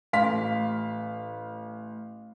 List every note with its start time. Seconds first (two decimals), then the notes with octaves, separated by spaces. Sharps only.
0.13 A1 F5 C6 B6